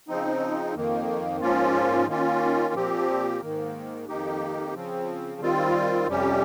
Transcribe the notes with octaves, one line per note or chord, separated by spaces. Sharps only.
C#3 F3 C4 D#4
F2 D#3 A#3
G#2 F3 A#3 C#4 F4
D#3 A#3 C#4 F4
A#2 F3 C4 G4
G#2 D#3 A#3
F2 D#3 A#3 D#4 G4
C#3 F3 C4
D#3 G3 C4 F4
F2 C3 G3 C#4 G4